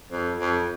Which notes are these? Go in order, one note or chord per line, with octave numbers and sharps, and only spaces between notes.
F2
F2